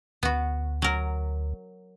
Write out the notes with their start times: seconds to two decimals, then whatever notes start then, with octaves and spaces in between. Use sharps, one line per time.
0.23 D2 B3 F#4
0.82 F#3 A#4